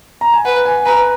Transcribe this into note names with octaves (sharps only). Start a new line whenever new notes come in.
A#5
G#5
B4 F#5
G#5
B4 A#5